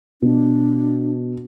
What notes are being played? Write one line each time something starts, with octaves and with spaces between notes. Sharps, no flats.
B2 D4